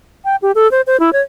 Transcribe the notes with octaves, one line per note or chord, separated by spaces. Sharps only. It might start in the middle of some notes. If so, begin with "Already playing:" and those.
G5
G4
A4
C5
C5
E4
C#5